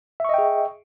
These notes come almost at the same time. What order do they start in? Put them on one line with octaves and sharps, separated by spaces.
E5 C#6 D#5 G5 G#4